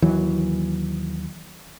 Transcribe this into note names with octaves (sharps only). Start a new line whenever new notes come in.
D#2 E3 F#3